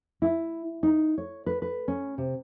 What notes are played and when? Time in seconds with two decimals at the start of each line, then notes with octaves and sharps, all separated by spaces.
0.22 E4
0.83 D#4
1.18 C#5
1.46 B4
1.62 B4
1.88 C#4
2.18 C3